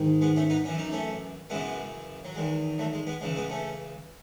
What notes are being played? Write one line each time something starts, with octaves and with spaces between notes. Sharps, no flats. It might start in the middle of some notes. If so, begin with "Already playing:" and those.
Already playing: G#2 D#3
G#3 B3
A3 C#4
B3 D#4
F#2 E3 C#4
D#4
A3 C#4
F#2 C#3 E3 G#3 B3
F#3
E2 D#3 G#3
F#3 A3
G#3
G#3 B3
C#2 C#3 E3 G#3
G#3 B3
A3 C#4